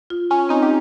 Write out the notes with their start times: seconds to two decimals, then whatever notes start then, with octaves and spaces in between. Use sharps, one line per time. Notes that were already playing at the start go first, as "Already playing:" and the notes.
0.10 F4
0.31 C#4 F4
0.49 C4 D#4
0.63 G4